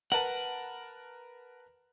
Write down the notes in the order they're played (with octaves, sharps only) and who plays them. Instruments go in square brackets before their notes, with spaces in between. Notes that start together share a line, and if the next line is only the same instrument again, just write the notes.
[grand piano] A#4 B4 A5 [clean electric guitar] F#5